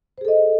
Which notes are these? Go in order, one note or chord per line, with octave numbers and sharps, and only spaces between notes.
G#4 A4 C5 D#5